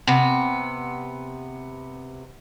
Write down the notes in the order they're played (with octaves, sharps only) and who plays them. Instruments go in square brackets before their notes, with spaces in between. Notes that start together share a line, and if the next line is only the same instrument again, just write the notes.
[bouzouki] C3 B3